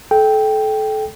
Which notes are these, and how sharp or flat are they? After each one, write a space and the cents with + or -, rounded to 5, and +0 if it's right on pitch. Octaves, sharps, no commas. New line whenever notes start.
A4 -30 G5 +0